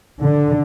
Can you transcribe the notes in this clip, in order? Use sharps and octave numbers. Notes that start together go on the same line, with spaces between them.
D3